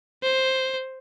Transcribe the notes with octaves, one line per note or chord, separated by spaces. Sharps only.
C5